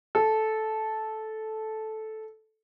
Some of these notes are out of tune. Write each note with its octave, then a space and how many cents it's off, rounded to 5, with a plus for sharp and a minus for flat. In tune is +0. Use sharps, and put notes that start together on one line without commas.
A4 -10